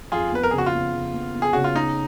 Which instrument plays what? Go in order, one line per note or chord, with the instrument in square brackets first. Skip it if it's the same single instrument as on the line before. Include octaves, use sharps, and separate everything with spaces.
[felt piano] F2 [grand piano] F4 G#4
[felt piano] B3 [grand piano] B4
[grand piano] A#4
[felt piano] C#3 [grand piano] G#4
[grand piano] F#4
F4
[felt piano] B3
C#3
B3
B3
[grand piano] G#4
[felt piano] C#3 [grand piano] F#4
[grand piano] F4
[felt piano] B3 [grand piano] D#4